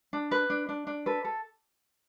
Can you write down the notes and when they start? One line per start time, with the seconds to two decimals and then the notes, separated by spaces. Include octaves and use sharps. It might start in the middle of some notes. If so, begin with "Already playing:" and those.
0.13 D4
0.31 B4
0.50 D4
0.69 D4
0.87 D4
1.06 A4 B4
1.25 A4